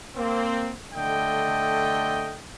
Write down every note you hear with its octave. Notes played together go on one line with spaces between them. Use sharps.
A#3 C4
D3 A3 D#5 G5